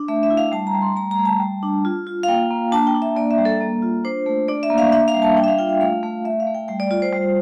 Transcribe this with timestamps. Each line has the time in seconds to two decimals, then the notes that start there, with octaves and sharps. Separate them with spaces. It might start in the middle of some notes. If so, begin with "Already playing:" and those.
Already playing: D4
0.08 A3 E5
0.23 E5
0.30 E4
0.37 F5
0.52 G3 A5
0.67 A#5
0.75 G3
0.82 C6
0.96 A3 A#5
1.11 A#5
1.18 A3
1.25 A5
1.40 G3
1.63 D4
1.85 F4
2.07 F4
2.23 F5
2.28 A#3 G5
2.50 A#3
2.72 D4 A5
2.87 G5
2.95 D4
3.02 E5
3.16 A#3 D5
3.31 E5
3.38 G3
3.45 A4
3.61 A#3
3.82 F4
4.05 D4 C5
4.26 A3
4.48 D4 D5
4.63 E5
4.70 A#3
4.78 F5
4.92 D4 E5
5.08 F5
5.14 G3
5.22 A5
5.37 D4 G5
5.44 E5
5.48 F5
5.59 F4 G5
5.69 G5
5.81 A3 F5
6.03 A3
6.25 A3 E5
6.40 F5
6.47 A3
6.55 G5
6.68 G3 G5
6.80 D5
6.91 F4 D5
7.02 C5
7.13 G3